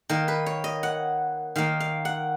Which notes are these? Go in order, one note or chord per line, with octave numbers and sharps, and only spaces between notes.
D#3 A#3 A#4
B4
C#5
D#5
F#5
D#3 A#3 F5
F5
F#5